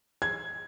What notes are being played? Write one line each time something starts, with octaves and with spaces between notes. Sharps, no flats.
G#6